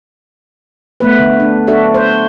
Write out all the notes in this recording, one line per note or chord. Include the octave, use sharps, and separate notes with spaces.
A3 B3 B4
D3
D4
D4 F#4 A4 D5 E5
C5